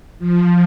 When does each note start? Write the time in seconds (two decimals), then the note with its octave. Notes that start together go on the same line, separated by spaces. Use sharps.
0.19 F3